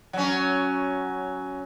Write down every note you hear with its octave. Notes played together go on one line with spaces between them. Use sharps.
F#3 C#4